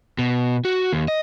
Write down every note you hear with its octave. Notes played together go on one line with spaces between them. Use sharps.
B2
F#4
D#2
D#5